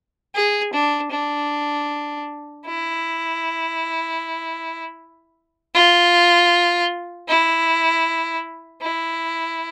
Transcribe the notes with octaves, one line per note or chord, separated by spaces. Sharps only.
G#4
D4
D4
E4
F4
E4
E4